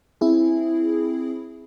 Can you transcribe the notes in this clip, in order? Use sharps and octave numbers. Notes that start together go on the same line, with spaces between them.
C4 E4 G#4